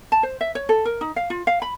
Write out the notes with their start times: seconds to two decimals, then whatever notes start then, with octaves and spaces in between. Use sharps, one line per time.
0.12 A5
0.23 C5
0.41 E5
0.55 C#5
0.69 A4
0.85 A#4
1.01 D#4
1.16 F5
1.30 F4
1.47 F5
1.62 B5